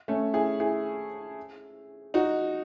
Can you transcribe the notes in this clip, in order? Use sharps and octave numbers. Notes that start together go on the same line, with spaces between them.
A3 C#4
E4 G#4
E4 G#4
D#4 F#4